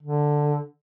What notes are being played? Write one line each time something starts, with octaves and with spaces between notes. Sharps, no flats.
D3